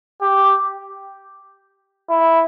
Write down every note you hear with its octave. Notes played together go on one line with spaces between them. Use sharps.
G4
E4